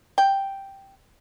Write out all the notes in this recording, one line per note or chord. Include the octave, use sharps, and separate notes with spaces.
G5